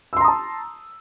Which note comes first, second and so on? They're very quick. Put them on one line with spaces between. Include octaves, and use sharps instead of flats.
E6 C6 A#5 D#6 A5